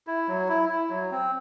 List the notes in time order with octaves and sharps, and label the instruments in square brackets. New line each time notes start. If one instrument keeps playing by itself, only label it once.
[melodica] E4
F#3
E4
E4
F#3
C4